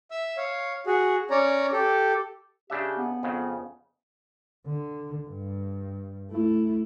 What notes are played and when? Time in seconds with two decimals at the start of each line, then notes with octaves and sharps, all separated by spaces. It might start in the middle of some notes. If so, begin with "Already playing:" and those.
0.11 E5 E6
0.37 C#5 F5
0.86 F#4 G#4
1.31 C#4 C#5 D5 A#5
1.73 G4 A4
2.70 C#3 D4 G4 E5
2.97 B3
3.23 F2 C#3
4.66 D3
5.28 G2
6.31 A3 E4